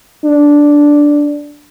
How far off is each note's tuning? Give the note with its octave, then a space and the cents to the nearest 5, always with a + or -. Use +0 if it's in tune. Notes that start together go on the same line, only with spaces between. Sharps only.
D4 -5